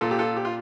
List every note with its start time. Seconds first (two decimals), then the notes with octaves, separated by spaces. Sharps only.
0.01 A#2 F4 A4
0.11 G4
0.19 F4 A4
0.37 G4
0.45 F4